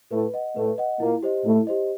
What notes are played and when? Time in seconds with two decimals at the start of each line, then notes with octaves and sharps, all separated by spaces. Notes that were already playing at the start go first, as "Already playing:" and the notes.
0.11 A2 A3 B4
0.34 D#5 F#5
0.55 A2 A3 B4
0.78 D#5 F#5
1.00 A#2 A#3 E4
1.23 G4 C5 D#5
1.44 A2 A3 E4
1.67 G4 C5 D#5